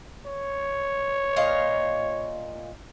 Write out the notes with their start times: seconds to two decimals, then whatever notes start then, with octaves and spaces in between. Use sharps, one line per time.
0.26 C#5
1.36 A#2 D#5 F5